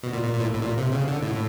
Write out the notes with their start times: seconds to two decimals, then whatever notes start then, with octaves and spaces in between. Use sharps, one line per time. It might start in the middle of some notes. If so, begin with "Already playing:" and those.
0.03 B2
0.13 A#2
0.24 A#2
0.34 A#2
0.40 A2
0.55 A2
0.62 A#2
0.78 C3
0.92 C#3
1.07 D3
1.22 A2